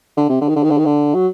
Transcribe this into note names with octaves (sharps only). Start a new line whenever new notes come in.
D3
C3
D3
D#3
D3
D#3
D3
D#3
D3
F#3